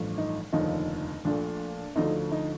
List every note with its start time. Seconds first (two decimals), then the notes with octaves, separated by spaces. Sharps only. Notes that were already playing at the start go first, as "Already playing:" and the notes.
Already playing: A1 G2 F3 A3
0.18 D#4
0.53 F1 D#2 D3 F3 D#4
1.25 A#1 A#2 A3 D4
1.95 D2 D3 F3 A3 D#4
2.32 D#4